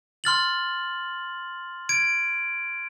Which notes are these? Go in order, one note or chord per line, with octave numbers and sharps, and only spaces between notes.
C6 F6 A6 F#7
G#6 D7